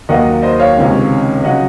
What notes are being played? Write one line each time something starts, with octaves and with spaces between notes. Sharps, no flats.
D#2 D#3 F#3 A#3 D#5 F#5
C5 D#5
C#5 F5
C#2 C3 D#3 G#3 C#4
C#3 F#3 C#4 D#5 F#5